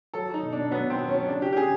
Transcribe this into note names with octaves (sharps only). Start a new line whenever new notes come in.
F#3 A4
F#3
D#4
B2
B2 D4
F#3 B3
B2
C4
F#3
C#4
F#3
C#3 D4
C#3 G4
G4
C#3 G#4